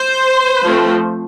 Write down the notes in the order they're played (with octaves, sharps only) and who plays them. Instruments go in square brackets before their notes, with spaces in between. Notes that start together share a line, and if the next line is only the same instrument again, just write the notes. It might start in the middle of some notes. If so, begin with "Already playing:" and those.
Already playing: [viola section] C5
F3 A3 C4